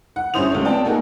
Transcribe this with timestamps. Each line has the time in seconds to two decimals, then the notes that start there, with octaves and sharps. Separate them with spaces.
0.16 F#5
0.34 G2 C#4 E4 C5 D#6 F7
0.52 C#2 F#3 A3
0.65 B3 C4 D5 G5 A5
0.85 A3 A#3 D#4 F#4 G#4 A#4